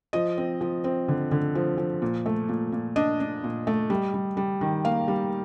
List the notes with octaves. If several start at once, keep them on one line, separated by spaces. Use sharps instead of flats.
F3 D#5
C4
F3
C4
D3
D3
F3
F3
A#2
A3
A#2
A#2
D4 D#5
D4
A#2
A3
G3
G3
G3
D#3
A#3 F5
G3